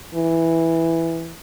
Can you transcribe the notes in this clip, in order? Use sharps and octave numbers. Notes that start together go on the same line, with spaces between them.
E3